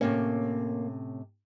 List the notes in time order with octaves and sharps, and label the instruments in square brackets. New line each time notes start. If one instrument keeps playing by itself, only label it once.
[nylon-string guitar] A2 C3 C#4 [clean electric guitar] A#3